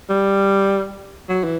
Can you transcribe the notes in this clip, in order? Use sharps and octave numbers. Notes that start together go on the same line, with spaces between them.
G3
F#3
E3